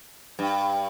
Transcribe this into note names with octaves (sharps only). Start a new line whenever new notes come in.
G2